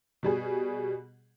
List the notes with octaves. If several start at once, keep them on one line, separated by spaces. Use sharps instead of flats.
B2 G3 G#4